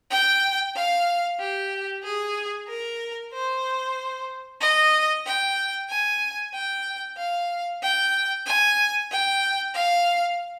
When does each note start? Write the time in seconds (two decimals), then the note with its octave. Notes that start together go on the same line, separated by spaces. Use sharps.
0.10 G5
0.75 F5
1.39 G4
2.03 G#4
2.68 A#4
3.33 C5
4.60 D#5
5.25 G5
5.89 G#5
6.54 G5
7.17 F5
7.82 G5
8.46 G#5
9.11 G5
9.74 F5